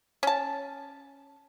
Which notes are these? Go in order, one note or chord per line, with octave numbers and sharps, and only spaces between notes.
C#4 A5